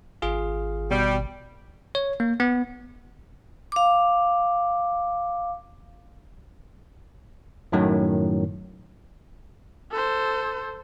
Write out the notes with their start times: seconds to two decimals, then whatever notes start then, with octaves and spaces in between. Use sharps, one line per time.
0.22 G#1 F4 G#4 F5
0.91 B2 G3
1.95 C#5
2.20 A#3
2.40 B3
3.72 F5 D6
7.72 F#2 A2 D#3 F#3
9.92 A4 C5